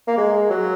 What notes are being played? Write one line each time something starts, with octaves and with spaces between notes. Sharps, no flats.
A#3
G#3
F#3